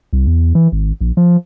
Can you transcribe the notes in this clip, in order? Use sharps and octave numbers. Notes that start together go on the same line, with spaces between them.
C2
E2
E3
G#1
A#1
F3